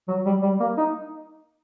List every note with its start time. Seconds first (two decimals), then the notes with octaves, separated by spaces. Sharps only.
0.08 F#3
0.26 G3
0.42 G3
0.60 A#3
0.77 D#4